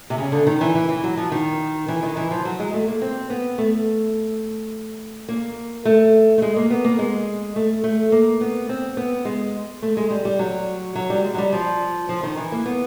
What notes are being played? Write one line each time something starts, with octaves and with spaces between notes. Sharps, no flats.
C3
C#3
D3
D#3
E3
E3
E3
F#3
F3
D#3
E3
D#3
E3
F3
F#3
G#3
A3
A#3
C4
B3
A3
A#3
A3
A3
G#3
A#3
B3
A#3
G#3
A3
A3
A#3
B3
C4
B3
G#3
A3
G#3
G3
G3
F#3
F#3
G3
G#3
F#3
G3
F3
F3
D#3
E3
A#3
B3